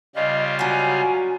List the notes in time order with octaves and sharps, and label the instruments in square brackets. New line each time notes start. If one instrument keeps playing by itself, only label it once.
[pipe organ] C#3 G3 F4 [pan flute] D#5
[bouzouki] F#3 F#4 [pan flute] G#5